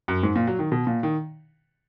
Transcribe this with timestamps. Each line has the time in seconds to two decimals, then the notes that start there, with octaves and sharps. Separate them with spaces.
0.08 F#2
0.23 G#2
0.36 A#2
0.47 F#3
0.59 D#3
0.72 B2
0.87 A#2
1.03 D#3